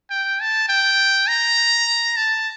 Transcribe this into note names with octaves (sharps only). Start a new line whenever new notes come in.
G5
A5
G5
A#5
A5